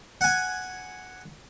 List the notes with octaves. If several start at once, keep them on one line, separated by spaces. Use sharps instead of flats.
F#5 G#5